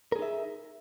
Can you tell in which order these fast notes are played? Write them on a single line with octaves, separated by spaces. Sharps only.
A#4 G#4 D#4 E5